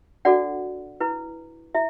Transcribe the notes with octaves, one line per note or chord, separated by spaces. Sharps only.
D4 F#4 A4 D5 F#5
E4 B4
E4 E5